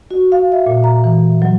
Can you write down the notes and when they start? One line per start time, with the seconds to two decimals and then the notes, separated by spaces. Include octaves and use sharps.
0.11 F#4
0.32 F5
0.52 E5
0.66 A#2
0.84 A#5
1.04 E3
1.42 F#3